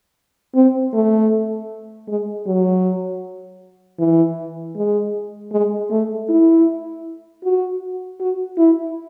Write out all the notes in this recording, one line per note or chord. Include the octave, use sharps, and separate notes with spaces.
C4
A3
G#3
F#3
E3
G#3
G#3
A3
E4
F#4
F#4
E4